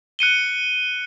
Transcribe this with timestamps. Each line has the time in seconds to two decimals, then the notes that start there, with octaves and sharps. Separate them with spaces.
0.19 F#6 C#7 D#7 G7